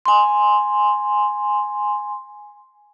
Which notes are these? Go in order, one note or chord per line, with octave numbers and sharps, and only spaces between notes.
G#5 C6